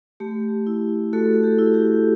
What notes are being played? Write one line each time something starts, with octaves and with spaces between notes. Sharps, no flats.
A3 G4
E4
A3 F#4 A4
A4
G4
E4
G4